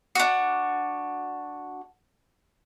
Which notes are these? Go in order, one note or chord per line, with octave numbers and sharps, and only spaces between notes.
D4 F#4